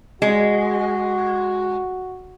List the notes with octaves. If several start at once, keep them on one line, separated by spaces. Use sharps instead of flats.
G#3 F#4